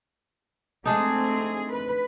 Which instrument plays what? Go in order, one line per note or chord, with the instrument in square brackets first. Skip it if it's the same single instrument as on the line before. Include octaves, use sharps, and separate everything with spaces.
[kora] G#3 D4 D#4 [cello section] A3 C4 G#4
[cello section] B4